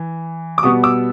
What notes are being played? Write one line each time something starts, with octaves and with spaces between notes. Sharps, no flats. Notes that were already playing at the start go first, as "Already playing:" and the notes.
Already playing: E3
D6
B2 G3 B3 C#6 D#6
D6 E6